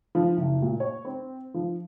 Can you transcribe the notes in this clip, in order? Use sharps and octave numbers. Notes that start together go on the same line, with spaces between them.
F3
F#1
A#2
C#5
C4
F3